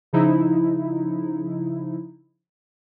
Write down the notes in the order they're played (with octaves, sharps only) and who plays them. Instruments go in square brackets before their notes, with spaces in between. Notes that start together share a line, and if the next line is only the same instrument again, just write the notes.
[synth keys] C#3 F3 D#4 E4